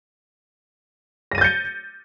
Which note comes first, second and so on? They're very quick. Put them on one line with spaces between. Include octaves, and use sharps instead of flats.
A#6 D#7 A6 G6 C#7